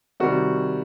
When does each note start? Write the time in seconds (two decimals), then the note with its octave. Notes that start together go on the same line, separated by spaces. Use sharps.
0.20 C3 D#3 G3 F#4